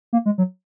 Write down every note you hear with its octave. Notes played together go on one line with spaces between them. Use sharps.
A#3
G#3
F#3